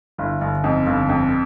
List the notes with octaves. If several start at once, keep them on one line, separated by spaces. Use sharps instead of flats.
G1 E4
G1
F2 D#4
G1
F2